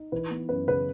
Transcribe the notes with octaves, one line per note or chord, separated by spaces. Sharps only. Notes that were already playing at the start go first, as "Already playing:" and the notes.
Already playing: D#4
E3 B4
B3
F#2 B4
C#3 B4